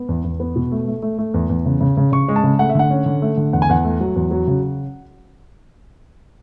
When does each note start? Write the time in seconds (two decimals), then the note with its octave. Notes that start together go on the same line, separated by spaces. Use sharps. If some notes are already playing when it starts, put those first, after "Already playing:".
Already playing: B3
0.09 E2
0.24 E2
0.40 B3
0.56 B2
0.72 A3
0.87 A3
1.02 A3
1.18 A3
1.34 E2
1.49 E2
1.66 C#3
1.81 C#3
1.97 C#3
2.12 C#3 C#6
2.28 G#3
2.36 A5
2.44 C#3
2.59 A3 F#5
2.69 E5
2.75 D3 F#5
2.91 C#4
3.06 D3
3.22 A3
3.37 D3
3.53 E2 F#5
3.62 G#5
3.69 E2 F#5
3.84 A3
4.01 F#3
4.16 E2
4.31 F#3
4.47 C#3